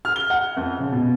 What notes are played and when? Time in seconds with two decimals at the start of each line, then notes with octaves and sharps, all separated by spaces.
0.05 F6
0.16 G7
0.30 F#5
0.57 F2
0.79 C#3
0.93 B2